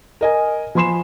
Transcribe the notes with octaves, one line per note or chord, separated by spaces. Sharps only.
A#4 D#5 G#5
F3 G#5 B5 C6 C7 E7